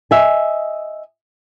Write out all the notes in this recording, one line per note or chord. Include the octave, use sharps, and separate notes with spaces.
D#5 E5 G#5